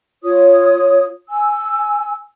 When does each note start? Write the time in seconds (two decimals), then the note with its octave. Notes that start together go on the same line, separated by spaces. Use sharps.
0.23 F4 C#5 D#6
1.30 G#5 E6